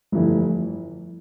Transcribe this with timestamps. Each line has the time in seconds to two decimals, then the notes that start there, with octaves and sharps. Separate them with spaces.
0.12 G1 F2 E3 A3 E4